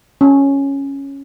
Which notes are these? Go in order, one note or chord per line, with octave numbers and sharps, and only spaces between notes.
C#4